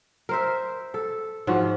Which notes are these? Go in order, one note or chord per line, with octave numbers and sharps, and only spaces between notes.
A#4 C5 E5
A4
G#2 F3 F#4